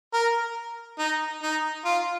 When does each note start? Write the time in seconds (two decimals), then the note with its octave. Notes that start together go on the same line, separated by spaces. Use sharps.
0.13 A#4
0.99 D#4
1.43 D#4
1.85 F4